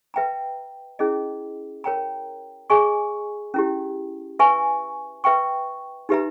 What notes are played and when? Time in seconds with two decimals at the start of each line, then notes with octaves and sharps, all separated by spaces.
0.14 B4 E5 G5 A#5
0.99 C#4 E4 G#4 D#5
1.84 A#4 C#5 G5 A#5
2.70 G#4 D#5 G#5 C#6
3.54 C#4 E4 G4
4.39 B4 E5 G#5 C#6
5.24 B4 E5 G5 C#6
6.09 D#4 G4 B4 E5 A#5